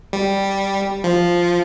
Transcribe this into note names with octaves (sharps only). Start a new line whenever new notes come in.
G3
F3